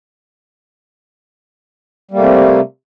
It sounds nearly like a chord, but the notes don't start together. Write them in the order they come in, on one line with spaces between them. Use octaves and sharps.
G3 A#3 A3 C3